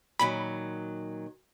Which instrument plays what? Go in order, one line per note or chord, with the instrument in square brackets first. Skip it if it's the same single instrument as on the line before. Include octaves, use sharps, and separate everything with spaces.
[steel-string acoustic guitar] A#2 D#3 F#3 [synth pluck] B5